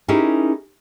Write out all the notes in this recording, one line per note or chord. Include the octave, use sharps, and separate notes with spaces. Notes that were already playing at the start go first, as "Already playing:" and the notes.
C#4 D#4 E4 G4 G#4 A#4